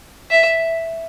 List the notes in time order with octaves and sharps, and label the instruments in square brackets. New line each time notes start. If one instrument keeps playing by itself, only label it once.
[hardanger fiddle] E5